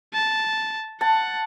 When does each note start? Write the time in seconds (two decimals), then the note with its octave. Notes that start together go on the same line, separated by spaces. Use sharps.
0.14 A5
1.01 F#5 A5